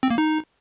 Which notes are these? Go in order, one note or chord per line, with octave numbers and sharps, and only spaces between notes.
C4
A#3
D#4